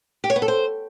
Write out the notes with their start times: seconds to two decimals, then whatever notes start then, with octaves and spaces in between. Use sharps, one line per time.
0.24 G4
0.30 C#5
0.36 B3
0.42 A4
0.48 C5